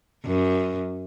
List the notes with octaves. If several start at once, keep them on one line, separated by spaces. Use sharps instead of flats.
F#2